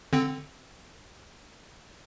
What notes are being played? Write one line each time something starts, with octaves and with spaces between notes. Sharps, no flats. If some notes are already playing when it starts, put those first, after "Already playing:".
D3 C4